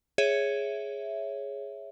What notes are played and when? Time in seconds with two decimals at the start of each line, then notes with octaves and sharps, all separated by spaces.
0.18 G#4 C#5 E5